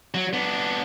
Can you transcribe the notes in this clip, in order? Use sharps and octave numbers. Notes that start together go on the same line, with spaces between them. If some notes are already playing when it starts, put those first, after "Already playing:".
F#3
B3 D4